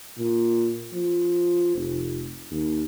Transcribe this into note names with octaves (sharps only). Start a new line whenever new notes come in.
A#2
F3
F1
D#2